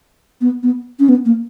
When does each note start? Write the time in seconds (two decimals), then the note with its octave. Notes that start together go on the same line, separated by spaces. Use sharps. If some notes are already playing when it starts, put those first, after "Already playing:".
0.41 B3
0.63 B3
1.00 C#4
1.09 B3
1.25 A#3